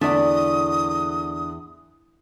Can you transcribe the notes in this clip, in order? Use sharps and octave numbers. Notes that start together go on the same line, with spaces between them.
E2 D3 A3 D5 D#6